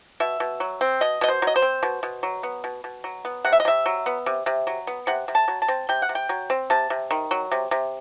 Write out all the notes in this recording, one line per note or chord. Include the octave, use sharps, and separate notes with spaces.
B2 E5
B2
F#3
C4
B2 D#5
B2 D#5
C5
F#3 D#5
C5
C4
B2
B2
F#3
B3
B2
B2
F#3
B3
C3 F#5
E5
D#5
C3 E5
F#3
B3
C3
C3
F#3
B3
C3 F#5
C3
A5
F#3
A5
C4
C3 G5
F#5
C3
G5
F#3
C4
C3 A5
C3
D#3
F#3
C3
C3